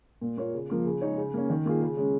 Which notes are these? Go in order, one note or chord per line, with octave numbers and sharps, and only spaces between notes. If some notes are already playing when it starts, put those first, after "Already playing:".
A#2
A#3 F4 C#5
C#3
F3 A#3 F4
C#3
G#3 D#4 C#5
C#3
A#3 C#4
D#3
A#3 F4 G#4
C#3
G#3 C#4